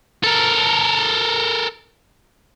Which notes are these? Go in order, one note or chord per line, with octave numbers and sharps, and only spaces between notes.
A4 A#4